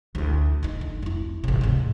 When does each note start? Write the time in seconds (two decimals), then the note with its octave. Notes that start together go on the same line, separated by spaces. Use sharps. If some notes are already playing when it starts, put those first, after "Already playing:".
0.15 D2 E4
0.63 A#3 D#4
0.81 D4
1.02 F2 E4
1.44 A1 C3
1.61 D2 G#2